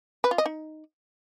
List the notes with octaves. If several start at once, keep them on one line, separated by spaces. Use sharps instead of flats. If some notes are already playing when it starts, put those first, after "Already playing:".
B4
F4
D#5
D#4